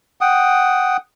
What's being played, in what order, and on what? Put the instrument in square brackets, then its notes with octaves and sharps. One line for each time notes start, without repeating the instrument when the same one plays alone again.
[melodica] F#5 G5 D#6